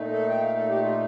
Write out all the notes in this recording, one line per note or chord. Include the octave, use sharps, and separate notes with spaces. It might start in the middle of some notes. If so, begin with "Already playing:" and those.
Already playing: A#2 A3 D#4
A4
G5
F5
A4
G4
F4